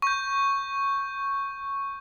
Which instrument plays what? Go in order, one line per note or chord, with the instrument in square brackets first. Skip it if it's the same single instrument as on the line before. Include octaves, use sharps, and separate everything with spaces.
[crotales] C#6 G6